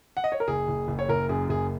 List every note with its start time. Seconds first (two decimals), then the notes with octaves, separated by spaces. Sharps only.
0.17 F#5
0.24 D#5
0.32 C#5
0.40 A#4
0.48 F#1 G#4
0.68 F#1
0.88 F#1
0.99 C#5
1.09 F#1 A#4
1.29 F#2 G#4
1.49 F#1 G#4